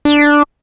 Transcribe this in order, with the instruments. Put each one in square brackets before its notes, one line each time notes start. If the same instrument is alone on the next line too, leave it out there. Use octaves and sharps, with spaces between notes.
[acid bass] D4